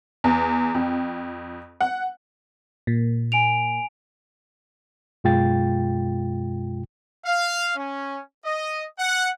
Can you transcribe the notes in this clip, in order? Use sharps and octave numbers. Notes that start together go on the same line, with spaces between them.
E2
F2
F#5
A#2
G#5 D7 F7
F#2 B2 G#3 F4 G5 A6
F5
C#4
D#5
F#5